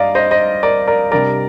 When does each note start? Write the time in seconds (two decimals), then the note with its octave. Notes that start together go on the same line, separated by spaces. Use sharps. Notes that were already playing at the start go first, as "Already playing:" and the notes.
Already playing: G2 D5 D#5 F5 A#5
0.15 C5 D#5
0.31 C5 D#5
0.63 A#4 D5
0.87 A#4 D5
1.12 C3 G3 D4 A#4 D5